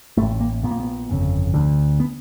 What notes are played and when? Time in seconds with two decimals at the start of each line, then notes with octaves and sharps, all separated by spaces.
0.17 A1 A2 A3
0.40 A#3
0.63 A#1 A#2 B3
0.71 A#3
0.80 B3
1.09 G1 F2 C#3
1.54 D2 D3
2.00 B3